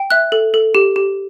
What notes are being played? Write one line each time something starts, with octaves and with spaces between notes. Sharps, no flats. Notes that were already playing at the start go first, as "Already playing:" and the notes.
Already playing: G5
E5 F#6
A4
A4
G4
G4